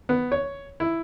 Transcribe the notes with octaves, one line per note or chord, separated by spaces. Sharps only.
B3
C#5
E4